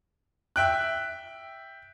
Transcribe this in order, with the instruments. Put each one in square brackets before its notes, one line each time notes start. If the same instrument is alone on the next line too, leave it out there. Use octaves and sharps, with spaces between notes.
[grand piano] E5 G5 F#6